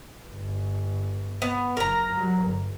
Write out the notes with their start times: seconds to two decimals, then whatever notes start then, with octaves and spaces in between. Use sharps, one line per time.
0.27 G1
1.42 B3
1.77 F#1 A#4 A#5
2.13 F#3 G3
2.44 G1